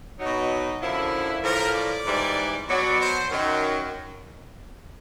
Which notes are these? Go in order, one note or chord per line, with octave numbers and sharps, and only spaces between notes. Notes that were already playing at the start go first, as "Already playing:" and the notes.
B2 F#3 D#4
F#2 D3 F3 E4
A2 F3 A#4
D5
G#2 E3 G3
B2 F#3 D5
C5
F#2 D#3 F#3